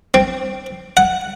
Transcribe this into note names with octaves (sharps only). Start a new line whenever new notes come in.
C4
F#5